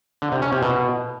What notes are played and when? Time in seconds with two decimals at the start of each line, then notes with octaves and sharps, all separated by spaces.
0.22 D3
0.32 C3
0.42 C#4
0.52 C3
0.62 B2